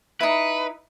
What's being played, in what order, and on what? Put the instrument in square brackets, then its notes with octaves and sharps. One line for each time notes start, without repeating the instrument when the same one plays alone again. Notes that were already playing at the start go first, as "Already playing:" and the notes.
[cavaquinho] D#4 E4 [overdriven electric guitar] B4